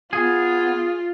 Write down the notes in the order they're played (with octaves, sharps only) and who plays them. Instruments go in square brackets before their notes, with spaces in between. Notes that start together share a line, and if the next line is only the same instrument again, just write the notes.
[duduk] B3 [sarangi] F4 [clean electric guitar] G#4